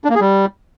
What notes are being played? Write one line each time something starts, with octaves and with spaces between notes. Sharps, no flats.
D4
A#3
G#4
G3